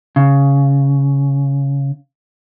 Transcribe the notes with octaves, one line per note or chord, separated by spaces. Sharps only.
C#3